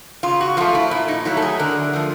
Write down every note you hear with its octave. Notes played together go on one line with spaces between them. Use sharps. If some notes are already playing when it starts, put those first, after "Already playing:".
C#3 F4
F#4
F3 A3 F4
E4
A#2 E4
D#4
F#3 A3 E4
A4
G#4
D3 A#4
F3 A3